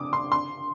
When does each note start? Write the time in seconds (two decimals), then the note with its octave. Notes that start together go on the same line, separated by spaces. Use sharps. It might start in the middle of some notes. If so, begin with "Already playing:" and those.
Already playing: D6 D#6
0.13 C6
0.32 C6